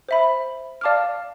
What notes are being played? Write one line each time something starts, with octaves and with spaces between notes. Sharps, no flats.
C5 E5 B5
D5 F5 A5 D6 F6